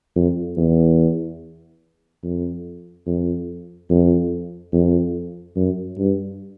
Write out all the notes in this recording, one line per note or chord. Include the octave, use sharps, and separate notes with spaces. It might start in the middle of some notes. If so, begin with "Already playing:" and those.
F2
E2
F2
F2
F2
F2
F#2
G2